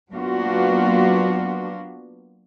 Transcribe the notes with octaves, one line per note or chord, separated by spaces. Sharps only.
F#3 A#3 B3 D4 F4 F#4